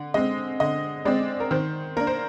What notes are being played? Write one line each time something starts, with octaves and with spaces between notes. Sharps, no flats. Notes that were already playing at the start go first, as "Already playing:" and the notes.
Already playing: D3
G#3 C4 D#5
D3 D#5
G#3 C4 D5
A#4
D#3 C5
A#3 D4 A#4
C5